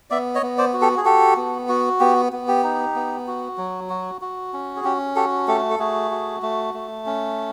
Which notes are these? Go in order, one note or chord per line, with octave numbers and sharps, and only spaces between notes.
B3 D5 E5
C#5 D#5
B3
C5 D5
F#4
G4 A4
G#4
F#4 G4 A4
B3
F#4
B3 G4
B3
G4
D#4
B3
F#4
F#3
F#4
F#4
C#4
G#4
C#4 G4
F#4 G4 A4
A3 G4 A4
A4
A3 F#4 G#4
F#4
A3
A3
C#4